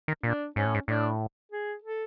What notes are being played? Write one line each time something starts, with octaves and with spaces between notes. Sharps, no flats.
D#3
A#2 D4
G#2 C#4
A2
G#2
A2 D4
G#4
A4